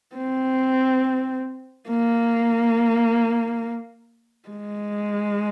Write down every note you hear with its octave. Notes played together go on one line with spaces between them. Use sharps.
C4
A#3
G#3